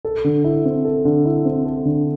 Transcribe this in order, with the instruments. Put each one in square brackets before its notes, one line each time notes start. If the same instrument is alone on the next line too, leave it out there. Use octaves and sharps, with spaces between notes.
[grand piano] A4
D3
E4
C4
A4
D3
E4
C4
A4
D3